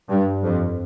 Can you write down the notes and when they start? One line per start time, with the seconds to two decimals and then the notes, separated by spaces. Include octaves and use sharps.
0.09 G2
0.43 F2